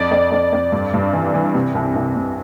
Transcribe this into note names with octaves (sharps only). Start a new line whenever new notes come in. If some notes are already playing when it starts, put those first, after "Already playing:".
Already playing: F2 D5
F2
F2
F2
G2
G2
E3
E3
C3
C2
C2
C3